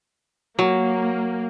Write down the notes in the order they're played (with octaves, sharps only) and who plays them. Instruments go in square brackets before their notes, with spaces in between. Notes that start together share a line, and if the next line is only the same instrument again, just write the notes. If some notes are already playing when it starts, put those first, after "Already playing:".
[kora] F#3 [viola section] A#3